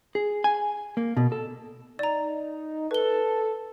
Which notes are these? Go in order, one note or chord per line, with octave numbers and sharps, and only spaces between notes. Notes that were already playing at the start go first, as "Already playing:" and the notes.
G#4
G#5
A#3
B2
A4
D#4 D5 A#5
A4 B4 G7